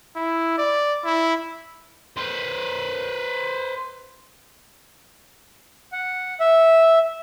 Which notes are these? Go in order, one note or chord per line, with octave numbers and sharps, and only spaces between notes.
E4
D5
E4
B4 C5
F#5
E5